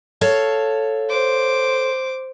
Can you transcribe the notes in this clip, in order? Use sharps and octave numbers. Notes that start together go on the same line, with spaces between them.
A4 C#5 F5
C5 D6